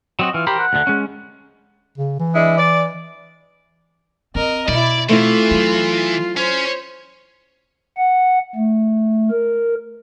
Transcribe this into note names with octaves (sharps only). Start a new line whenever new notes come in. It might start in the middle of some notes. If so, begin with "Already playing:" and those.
F#3 C4 F#4 D#5
E3 F4
G4 A#4 C5 B5
F#5
D2 D3
G#3 C#4
C#3
E3
G#3 D4 E4
D5
C4 A#4 D#5
B2 E4 D5
E3 A3 C4 E4 F4
F#3
C#4 C5
F#5
A3
A#4